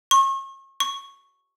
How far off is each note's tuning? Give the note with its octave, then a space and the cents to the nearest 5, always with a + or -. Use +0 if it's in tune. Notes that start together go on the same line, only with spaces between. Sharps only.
C#6 -40
C#6 -5